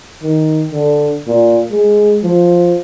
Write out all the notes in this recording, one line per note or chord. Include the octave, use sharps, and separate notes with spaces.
D#3
D3
A#2
G#3
F3